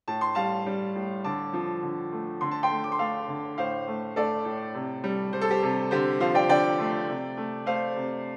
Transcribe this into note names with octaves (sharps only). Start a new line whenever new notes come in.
A2 A5
C6
G3 F5 A5
G3
A2
D3 A5 D6
F3
D3
A3
D3 C6
A5
G5 C6
A3
D6
C6
A3 F5 A5
D3
A2 C5 F5
A3
A3 A4 D5
A2
C3
G3
G3 C5
A4
G4 C5
C3 A4
D3 G4 C5
F3 C5 F5
D5 G5
D3 D5 G5
A3
C3
A3
A3 C5 F5
C3